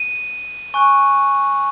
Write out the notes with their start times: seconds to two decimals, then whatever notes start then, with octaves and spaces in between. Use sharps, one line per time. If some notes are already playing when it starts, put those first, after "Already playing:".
Already playing: D#7
0.74 G#5 C#6 F#6